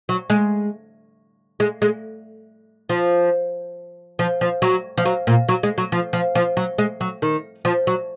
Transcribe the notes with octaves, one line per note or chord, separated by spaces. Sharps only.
F#3
G#3
G#3
G#3
F3
F3
F3
F#3
F3
F#3
A#2
F#3
G#3
F#3
F3
F3
F3
F#3
G#3
F#3
D#3
F3
F#3